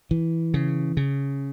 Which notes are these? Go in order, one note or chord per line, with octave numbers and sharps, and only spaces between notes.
E3
C#3
C#3